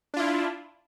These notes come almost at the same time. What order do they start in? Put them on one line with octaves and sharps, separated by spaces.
D4 F4 E4